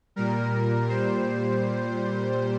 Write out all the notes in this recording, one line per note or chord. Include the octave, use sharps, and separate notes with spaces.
A#2 G3 A#4
A#2 G3 C5